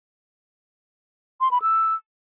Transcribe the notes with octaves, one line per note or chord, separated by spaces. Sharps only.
C6
B5
E6